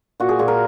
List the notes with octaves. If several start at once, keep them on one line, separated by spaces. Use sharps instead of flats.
A#2 F#4
G#4
A#2 G#4
A#4